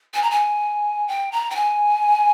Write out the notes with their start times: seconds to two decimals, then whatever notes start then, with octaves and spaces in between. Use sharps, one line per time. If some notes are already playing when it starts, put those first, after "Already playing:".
0.14 G#5
0.22 A#5
0.31 G#5
1.08 G5
1.32 A#5
1.50 G5
1.55 G#5